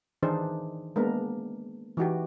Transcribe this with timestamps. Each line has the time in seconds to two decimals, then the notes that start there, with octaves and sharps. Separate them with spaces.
0.23 D#3 E3 D4 D#4 G#4 C5
0.96 G#3 A#3 B3 D4 A#4
1.97 E3 D#4 F#4 G4